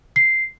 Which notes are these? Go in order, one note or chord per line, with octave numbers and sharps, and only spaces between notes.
C7